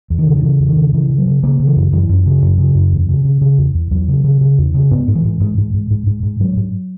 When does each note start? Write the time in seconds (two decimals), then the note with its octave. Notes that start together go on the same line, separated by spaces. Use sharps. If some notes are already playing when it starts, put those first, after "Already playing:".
0.10 E2
0.19 D#3
0.27 C#3
0.36 D#3
0.43 C#3 E3
0.59 E2
0.68 D#3
0.76 C#3
0.93 C#3 E3
1.10 C#3
1.18 F#3
1.26 C#3
1.43 C#3 A#3
1.59 C#3
1.67 E3
1.76 F#2
1.92 F#2 E3
2.09 F#2
2.26 C#3
2.43 F#2
2.58 C#3
2.75 F#2
2.92 E2
3.09 C#3
3.25 C#3
3.41 C#3
3.58 E2
3.74 E2
3.91 E2 F#3
4.08 C#3
4.24 C#3
4.41 C#3
4.58 E2
4.74 C#3
4.91 G#2 B3
5.08 G#2
5.15 E3
5.24 G#2
5.41 G#2
5.58 G#2
5.74 G#2
5.91 G#2
6.07 G#2
6.23 G#2
6.40 G#2 F#3
6.56 G#2